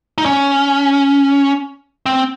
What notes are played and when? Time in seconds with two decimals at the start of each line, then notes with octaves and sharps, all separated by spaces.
0.18 D#4
0.26 C#4
2.06 C4